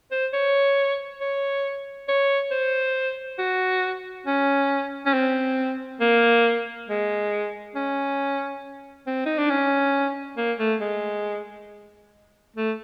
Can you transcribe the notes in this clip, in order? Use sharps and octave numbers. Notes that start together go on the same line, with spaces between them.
C5
C#5
C#5
C#5
C5
F#4
C#4
C#4
C4
A#3
G#3
C#4
C4
D#4
D4
C#4
A#3
A3
G#3
A3